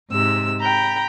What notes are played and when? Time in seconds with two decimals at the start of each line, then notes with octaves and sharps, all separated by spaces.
0.11 G#2 C3 E6
0.61 G5 A#5 B5